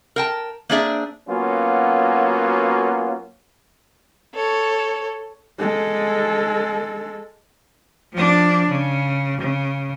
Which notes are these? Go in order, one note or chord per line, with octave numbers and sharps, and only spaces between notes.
A#4 G5 A5
A#3 C4 D4 G#4 D5 E5
F#3 A#3 B3 C#4 F4 F#4
A4 C#5
G#3 A4
F3 D4
C#3
C#3